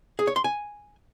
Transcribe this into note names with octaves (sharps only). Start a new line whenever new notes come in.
G#4
C#5
C6
G#5